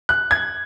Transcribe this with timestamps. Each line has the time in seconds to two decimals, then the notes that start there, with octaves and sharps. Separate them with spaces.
0.09 F#6
0.31 G#6